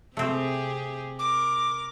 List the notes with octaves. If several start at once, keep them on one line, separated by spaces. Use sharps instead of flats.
C3 A3 C4 G4 G#4
A#4 D6